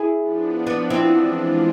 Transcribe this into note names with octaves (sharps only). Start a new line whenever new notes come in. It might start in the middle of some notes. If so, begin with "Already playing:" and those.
Already playing: E4 G#4
F3 B3 D4
B3 D4
C4 E4
E3 G#3 D4 F4